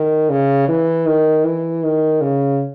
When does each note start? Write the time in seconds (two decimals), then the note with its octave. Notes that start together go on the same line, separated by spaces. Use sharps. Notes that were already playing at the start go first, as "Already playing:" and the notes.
Already playing: D#3
0.30 C#3
0.68 E3
1.06 D#3
1.44 E3
1.83 D#3
2.21 C#3